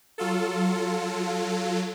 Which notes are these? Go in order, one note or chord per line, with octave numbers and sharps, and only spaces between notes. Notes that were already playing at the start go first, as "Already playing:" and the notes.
F#3 F4 A4